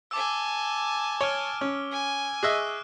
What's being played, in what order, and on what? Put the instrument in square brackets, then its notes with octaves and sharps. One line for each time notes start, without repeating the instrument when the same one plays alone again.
[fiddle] G#5 A5 [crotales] D6 E6
[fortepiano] C#5 [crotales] F6 D7 G7
[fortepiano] C#4
[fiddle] G#5
[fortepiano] G#4 D#5 E5 [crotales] C#6 E6 F#6